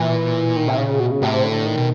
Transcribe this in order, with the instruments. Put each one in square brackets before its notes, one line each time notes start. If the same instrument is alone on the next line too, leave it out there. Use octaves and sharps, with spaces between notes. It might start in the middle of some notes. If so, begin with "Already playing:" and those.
Already playing: [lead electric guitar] A#2 [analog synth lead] E3
[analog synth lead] D#3
C3
C#3
B2
C#3
[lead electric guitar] A2 [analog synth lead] C3
[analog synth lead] D3
D#3
[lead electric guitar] B2